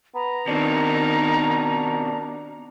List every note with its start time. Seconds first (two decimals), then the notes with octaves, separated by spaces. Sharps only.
0.15 B3 A#5
0.48 B2 D#3 C4 D4